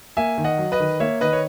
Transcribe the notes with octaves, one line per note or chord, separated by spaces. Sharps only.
A#3 E5 G#5
D#3
D#5 F#5
F#3
B4 D#5
D#3
A#3 C#5 E5
D#3 B4 D#5
C#5